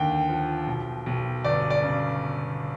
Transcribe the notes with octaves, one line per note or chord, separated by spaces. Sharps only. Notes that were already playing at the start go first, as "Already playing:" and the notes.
Already playing: D#2 D3 G5
F3
B1
B1
G1 D5
D5
C#3